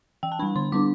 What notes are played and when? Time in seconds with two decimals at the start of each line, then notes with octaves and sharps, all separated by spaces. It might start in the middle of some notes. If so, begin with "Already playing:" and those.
0.23 E3 G5
0.32 A5
0.39 G3 D4 B5
0.56 D3 C6
0.72 G3 B3 D4 D6